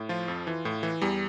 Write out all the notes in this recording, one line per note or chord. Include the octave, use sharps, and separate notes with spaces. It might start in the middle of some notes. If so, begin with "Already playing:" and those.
Already playing: A2
F3 F4
F2
E3
A2
E3
E2 G3